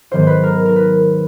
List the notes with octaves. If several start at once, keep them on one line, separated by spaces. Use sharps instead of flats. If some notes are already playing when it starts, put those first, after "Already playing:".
G#2 D#3 F#3 B3 C5
B4
A#4
A#4
B4